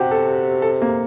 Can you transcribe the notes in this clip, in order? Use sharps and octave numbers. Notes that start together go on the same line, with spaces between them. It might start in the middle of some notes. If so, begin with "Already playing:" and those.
Already playing: C3 F#4 G4
A4
A4
A#3